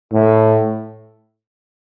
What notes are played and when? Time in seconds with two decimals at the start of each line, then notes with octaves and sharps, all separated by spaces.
0.13 A2